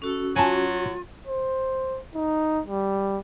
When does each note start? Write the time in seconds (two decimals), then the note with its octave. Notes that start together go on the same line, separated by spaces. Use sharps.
0.02 C#4 F#4 A4
0.36 F#3 F4 G#5 A5
1.27 C5
2.15 D#4
2.67 G3